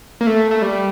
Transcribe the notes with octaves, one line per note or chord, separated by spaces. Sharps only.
A#3
A3
A3
G3